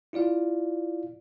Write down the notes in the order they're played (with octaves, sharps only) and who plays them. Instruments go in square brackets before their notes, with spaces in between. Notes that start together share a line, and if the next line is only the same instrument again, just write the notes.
[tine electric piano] E4 F4 D5 F5